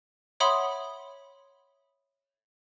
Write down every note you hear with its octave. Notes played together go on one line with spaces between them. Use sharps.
C#5 E5 F#5 B5 C6 D#6